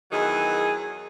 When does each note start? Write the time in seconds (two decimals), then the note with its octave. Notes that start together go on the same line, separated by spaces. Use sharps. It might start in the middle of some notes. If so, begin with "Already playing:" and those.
0.12 E2 D#3 F#3 G#4